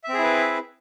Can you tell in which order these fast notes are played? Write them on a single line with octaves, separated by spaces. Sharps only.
E5 C4 G#4 E4 B4